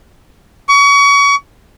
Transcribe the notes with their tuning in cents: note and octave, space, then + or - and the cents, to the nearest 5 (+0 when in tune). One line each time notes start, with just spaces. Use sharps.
C#6 +30